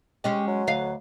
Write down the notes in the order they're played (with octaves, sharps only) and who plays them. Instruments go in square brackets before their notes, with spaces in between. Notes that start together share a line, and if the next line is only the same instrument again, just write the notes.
[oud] G#3 C#4 D#5 [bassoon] G4
[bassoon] F#3
[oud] D2 D#5 F5